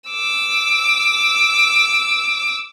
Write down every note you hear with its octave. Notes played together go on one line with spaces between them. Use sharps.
D6 E6